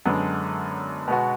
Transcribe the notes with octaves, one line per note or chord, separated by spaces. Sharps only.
F#2 D3 G#3 B3 D4
B2 G#3 B3 F#4